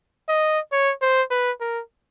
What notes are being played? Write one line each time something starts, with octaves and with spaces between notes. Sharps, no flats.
D#5
C#5
C5
B4
A#4